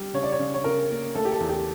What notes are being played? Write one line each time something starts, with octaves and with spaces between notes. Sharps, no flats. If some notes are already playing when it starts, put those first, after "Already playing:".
Already playing: G3
C#3 C#5
D5
C#5
C#3
C#5
C#3 A#4
A#3
A3 A4
G4
A4
E2
G4